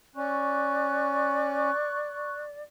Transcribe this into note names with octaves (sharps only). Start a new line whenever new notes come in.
C#4 D5 C#6 F#6